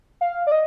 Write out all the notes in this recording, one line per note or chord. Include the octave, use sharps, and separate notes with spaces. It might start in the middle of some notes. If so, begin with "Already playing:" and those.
F5
D5
D#5